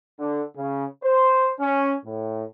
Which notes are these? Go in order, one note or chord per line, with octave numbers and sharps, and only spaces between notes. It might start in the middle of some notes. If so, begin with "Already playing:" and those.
D3
C#3
C5
C#4
A2